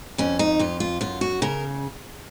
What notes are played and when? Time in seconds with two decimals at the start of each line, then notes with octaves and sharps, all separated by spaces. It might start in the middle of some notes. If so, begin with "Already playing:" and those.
0.18 F2 C#4
0.39 D#4
0.59 F2 F4
0.80 F4
1.01 F#2 F4
1.21 F#4
1.42 C#3 A#4